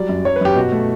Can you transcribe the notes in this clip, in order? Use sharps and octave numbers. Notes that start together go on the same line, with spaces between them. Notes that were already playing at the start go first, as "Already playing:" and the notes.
Already playing: F#3 G3 D5
F#2
F#3 C#5
B4
F#2 G4
B2 F#4
A3